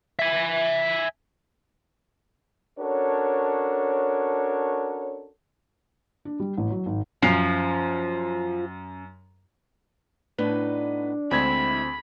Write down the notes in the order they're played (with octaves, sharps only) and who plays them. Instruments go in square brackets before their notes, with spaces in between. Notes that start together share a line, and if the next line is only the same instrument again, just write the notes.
[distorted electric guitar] E5 G#5
[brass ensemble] C#4 D4 F#4 A4 A#4 C#5
[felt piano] D4
G3
A1
F#3
G#1
[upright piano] F#2 [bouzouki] F3
[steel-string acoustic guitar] A2 B3 D#4 [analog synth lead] D4 [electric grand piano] B4
[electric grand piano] D2 C4 G#6 [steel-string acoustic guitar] G#3 E4 [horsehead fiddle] B5